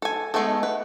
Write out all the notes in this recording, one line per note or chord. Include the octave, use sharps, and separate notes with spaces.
A4 G#5
G#3 A3 B3 D#4 A4
B4